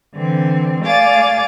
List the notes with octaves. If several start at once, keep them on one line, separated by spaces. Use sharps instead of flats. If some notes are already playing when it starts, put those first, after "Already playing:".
D3 E3 C4
A3 D5 F5 G#5 D6 A6